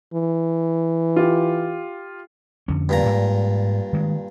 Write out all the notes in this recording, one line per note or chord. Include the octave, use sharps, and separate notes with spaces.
E3
F4 G4
F2 D3 C#4
G2 A#2 A#5
G#2
D#3 G#3